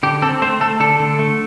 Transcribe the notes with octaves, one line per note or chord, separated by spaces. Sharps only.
D3 G4
C4 A4
A3 C5
A3 A4
D3 A4
D3
A3